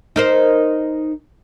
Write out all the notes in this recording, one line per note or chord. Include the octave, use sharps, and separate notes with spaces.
D#4 A#4 C5